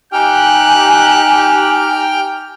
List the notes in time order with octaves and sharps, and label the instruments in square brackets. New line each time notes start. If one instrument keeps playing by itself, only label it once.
[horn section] D#4 G4 [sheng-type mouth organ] G5 F6 [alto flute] G#5 [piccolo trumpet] F#6